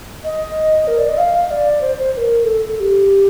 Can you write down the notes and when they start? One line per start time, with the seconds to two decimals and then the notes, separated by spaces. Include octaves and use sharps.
0.24 D#5
0.88 A#4
0.98 D5
1.09 D#5
1.18 F5
1.34 F5
1.51 D5
1.81 C5
1.97 C5
2.13 C5
2.17 A#4
2.44 A4
2.76 A4
2.80 G4